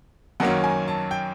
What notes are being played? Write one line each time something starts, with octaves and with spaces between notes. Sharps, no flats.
F#2 D#3 F#3 A#3 C#4 F#5
G#5
A5
G5